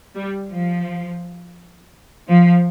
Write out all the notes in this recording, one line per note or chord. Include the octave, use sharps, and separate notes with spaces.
G3
F3
F3